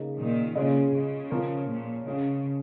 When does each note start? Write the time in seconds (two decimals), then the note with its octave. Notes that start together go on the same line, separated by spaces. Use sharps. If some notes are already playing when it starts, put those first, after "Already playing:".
Already playing: C#3 A#3 D#4 G#4 D#5
0.17 A#2 D#3
0.55 C#3 G#3 C#4 F4 G#4 D#5
0.93 C#3
1.31 F3 C#4 F4 A#4 C#5
1.68 A#2
2.06 C#3 G#3 C#4 G#4 F5